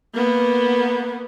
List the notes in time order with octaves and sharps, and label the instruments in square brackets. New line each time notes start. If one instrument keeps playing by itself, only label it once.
[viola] A#3 B3